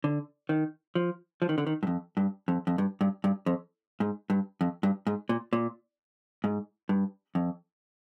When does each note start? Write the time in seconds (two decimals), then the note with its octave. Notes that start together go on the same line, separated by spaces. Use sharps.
0.04 D3
0.49 D#3
0.95 F3
1.42 F3
1.49 D#3
1.58 D3
1.67 D#3
1.83 G2
1.87 F2
2.17 G2
2.48 F2
2.67 F2
2.78 G2
3.01 G2
3.24 G2
3.46 F2
4.00 G#2
4.30 G2
4.61 F2
4.83 G2
5.07 G#2
5.29 A#2
5.53 A#2
6.44 G#2
6.89 G2
7.35 F2